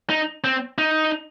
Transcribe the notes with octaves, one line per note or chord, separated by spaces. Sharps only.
D#4
C4
D#4